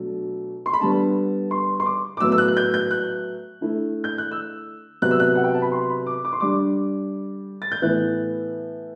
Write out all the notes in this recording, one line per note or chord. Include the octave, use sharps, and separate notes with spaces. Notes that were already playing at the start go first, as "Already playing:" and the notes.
Already playing: B2 F#3 A3 D4
C6
B5
D3 G3 B3 A5
C6
C6
D6
D6
A2 F#3 B3 E6
E6
F#6
F#6
G6
G6
F#6
D3 A3 E4
G6
F#6
E6
C3 F#3 B3 F#6
E6
F#6
F#5
G5
A5
B5
C6
B5
D6
D6
C6
D3 G3 D4 D6
A6
G6
A2 E3 B3 E4 F#6